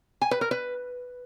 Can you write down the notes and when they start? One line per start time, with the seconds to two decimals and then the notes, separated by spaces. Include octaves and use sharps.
0.22 G#5
0.31 B4
0.41 A#4
0.51 B4